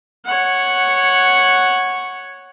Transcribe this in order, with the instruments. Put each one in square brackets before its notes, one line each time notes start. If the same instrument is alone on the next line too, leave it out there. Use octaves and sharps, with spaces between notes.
[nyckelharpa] C#5 F#5